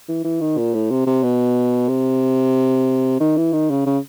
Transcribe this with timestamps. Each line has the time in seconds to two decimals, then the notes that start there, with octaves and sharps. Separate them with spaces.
0.08 E3
0.24 E3
0.41 D#3
0.57 A#2
0.74 A2
0.90 C3
1.07 C3
1.23 B2
1.88 C3
3.20 D#3
3.37 E3
3.53 D#3
3.70 C#3
3.86 C#3